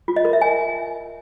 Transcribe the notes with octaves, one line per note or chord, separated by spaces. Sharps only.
F4
D#5
A#4
E5
G#5